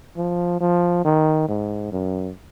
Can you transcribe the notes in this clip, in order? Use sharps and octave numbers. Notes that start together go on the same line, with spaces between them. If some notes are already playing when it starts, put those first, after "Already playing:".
F3
F3
D#3
G#2
F#2